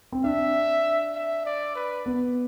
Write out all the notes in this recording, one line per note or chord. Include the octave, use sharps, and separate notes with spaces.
C4
D4 E5
E5
D5
B4
B3